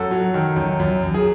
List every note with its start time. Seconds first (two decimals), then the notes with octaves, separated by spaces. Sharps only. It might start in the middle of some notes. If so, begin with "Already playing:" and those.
Already playing: F#2 F#4 A4
0.11 F#3
0.34 D#3
0.56 F#2
0.80 F#2
1.03 F#2
1.14 G#4